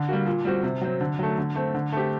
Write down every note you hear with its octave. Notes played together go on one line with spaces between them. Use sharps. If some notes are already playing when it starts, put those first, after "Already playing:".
Already playing: D3
G3 A#3 F#4
A#2
G3 C4 F#4
C3
F#3 C4
D3
F#3 A3
D3
A3 C4
D3
A3 C4 G4